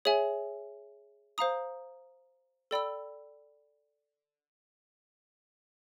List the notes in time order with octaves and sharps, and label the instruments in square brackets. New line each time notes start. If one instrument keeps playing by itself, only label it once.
[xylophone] G#4 C#5 E5 G#5
C5 F5 A#5 D#6
A4 D5 G5 B5 E6